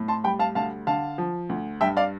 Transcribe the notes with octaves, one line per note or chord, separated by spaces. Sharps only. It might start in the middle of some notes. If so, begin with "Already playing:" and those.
Already playing: A2
A5 C6
G3 G5 B5
F5 A5
D2 F5 A5
D3 F5 A5
F3
D2
G2 E5 G5
D5 F5